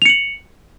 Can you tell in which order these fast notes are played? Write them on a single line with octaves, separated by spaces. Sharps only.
F7 C#7 F#7